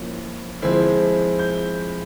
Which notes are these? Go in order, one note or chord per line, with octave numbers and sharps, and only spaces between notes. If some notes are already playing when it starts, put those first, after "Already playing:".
Already playing: F3 A#3 C#4 E4
F3 G#3 C4 E4
G6